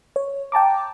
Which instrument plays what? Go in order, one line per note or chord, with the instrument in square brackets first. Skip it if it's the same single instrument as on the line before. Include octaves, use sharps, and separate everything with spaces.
[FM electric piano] C#5
G5 A5 A#5 D6